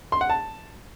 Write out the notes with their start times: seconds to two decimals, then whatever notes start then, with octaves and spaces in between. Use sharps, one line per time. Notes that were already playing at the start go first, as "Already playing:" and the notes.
0.12 C6
0.21 F#5
0.30 A5